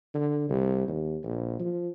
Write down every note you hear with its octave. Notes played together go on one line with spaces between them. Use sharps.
D3
C2
D#2
A#1
F3